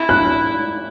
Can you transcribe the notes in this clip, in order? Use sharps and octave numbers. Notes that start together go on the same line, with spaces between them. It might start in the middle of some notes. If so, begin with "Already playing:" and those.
Already playing: E4
F#6